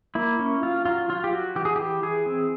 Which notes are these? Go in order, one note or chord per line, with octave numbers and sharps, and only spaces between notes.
A#3 E4
C#4
F#3 F4
F#3 F4
F#3 F4
G4
F#3 F#4
E3 G4
G#4
E3 G4
E3 G#4
C4